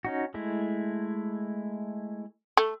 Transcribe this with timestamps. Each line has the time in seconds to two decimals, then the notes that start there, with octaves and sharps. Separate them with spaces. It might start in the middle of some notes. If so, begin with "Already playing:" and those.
0.05 C#4 D#4 F#4
0.34 G#3 A3 E4
2.57 A3